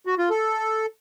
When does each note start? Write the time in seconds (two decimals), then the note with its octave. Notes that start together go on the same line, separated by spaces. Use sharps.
0.06 F#4
0.18 F4
0.30 A4